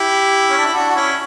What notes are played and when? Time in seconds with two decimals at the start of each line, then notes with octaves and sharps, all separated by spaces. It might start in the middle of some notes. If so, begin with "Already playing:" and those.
Already playing: E4 G4
0.50 C#4
0.57 D4
0.66 E4
0.74 D4 F#4
0.89 F#4
0.96 C#4 E4